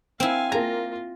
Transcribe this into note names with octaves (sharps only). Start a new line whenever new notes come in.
C4 E4 F5 G#5
A#3 F4 A#5 A#6